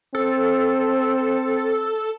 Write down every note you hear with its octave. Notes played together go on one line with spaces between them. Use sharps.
C4 A4